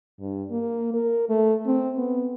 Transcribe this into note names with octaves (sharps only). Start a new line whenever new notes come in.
G2
A#3
A#4
A3
C4
B3